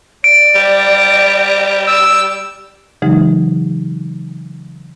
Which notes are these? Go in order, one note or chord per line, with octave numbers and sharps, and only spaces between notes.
D5 D7
G3
E6
C#3 E3 F#3 G#3 D#4 G4